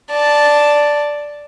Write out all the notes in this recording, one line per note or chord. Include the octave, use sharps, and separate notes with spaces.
D5 A5